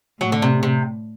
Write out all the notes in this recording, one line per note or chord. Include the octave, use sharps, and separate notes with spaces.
A2 F#3
D3
C3
C3